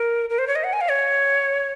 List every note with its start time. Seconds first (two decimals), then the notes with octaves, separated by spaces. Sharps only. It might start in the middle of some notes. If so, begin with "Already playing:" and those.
Already playing: A#4
0.30 A#4
0.39 C5
0.47 C#5
0.55 D#5
0.64 F#5
0.73 G#5
0.81 F5
0.90 C#5